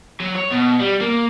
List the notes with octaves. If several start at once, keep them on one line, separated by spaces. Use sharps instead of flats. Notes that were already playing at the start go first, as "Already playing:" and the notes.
F#3
C#5
B2
G3
A#3